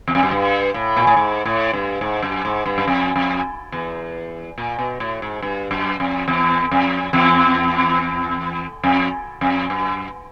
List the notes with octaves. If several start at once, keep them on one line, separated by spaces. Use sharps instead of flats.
E2
F2
F#2
G2
A2
A#2
A2
G#2
A2
G2
G#2
F#2
G#2
G2
F#2
F2
F2
E2
A#2
B2
A2
G#2
G2
F#2
F2
E2
F2
E2
F2
F2
F#2